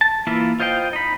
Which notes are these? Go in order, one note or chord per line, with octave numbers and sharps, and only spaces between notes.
A5
E3 A#3 E4 F4
F4 C5 D#5 F5 G5
D#4 B5